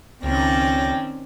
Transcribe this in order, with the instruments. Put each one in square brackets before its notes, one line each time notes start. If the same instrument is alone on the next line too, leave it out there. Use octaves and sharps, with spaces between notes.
[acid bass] C#2 [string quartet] D#3 D5 A#6 [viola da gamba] C4 C#4 [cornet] G5